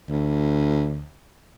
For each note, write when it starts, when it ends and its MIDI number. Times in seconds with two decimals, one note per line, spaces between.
0.09 1.08 38